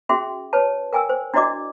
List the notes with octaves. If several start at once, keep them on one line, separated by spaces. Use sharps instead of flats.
C#4 F#4 G#4 E5 G5 C6
B4 C#5 A5
A#4 G5 G#5 D#6 E6
C5
D4 E4 F#4 D5 D#5 D6